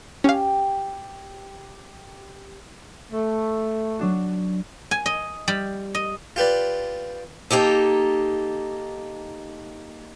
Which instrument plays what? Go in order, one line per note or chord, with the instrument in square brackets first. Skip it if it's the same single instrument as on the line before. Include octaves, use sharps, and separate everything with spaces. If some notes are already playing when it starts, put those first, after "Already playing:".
[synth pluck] C#4 F5 [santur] G4
[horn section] A3
[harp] F#3 D4 F#4
[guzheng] G#5
D#5
G3
D#5
[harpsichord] F4 G4 B4 D5
[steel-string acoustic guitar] A#3 D#4 G4 A4